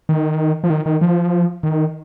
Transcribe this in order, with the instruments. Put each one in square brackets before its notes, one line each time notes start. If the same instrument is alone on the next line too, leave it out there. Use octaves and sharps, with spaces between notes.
[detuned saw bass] D#3
F3
D#3
D#3
F3
D#3